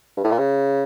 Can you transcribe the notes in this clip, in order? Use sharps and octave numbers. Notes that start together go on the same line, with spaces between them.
G2
A2
A#2
C#3